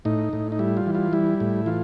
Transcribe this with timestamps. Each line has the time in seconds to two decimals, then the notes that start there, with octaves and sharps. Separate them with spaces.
0.05 A2 D#4
0.33 A2
0.52 D#4
0.59 G3 E4
0.77 F4
0.86 E3
0.95 F4
1.13 G3 E4
1.40 A2
1.66 E3 F4